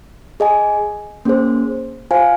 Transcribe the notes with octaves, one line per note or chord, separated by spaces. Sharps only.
G#4 D#5 G#5
A#3 C#4 G#4 C5
F4 C5 F5 G#5